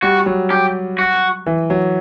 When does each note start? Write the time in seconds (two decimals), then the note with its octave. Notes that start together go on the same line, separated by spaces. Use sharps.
0.03 G3 F#4
0.26 F#3
0.51 G4
0.99 F#4
1.46 E3
1.70 F#3